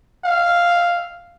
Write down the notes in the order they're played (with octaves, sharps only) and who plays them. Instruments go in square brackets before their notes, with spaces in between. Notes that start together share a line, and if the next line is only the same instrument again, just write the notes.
[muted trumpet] F5